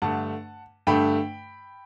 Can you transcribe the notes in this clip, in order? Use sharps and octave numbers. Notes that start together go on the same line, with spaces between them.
G2 D3 A3 F#5 A5
G2 D3 A3 G5 B5